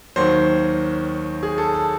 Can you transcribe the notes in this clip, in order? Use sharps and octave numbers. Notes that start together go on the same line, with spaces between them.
D#2 D#3 F#3 C5
G#4
A4
A4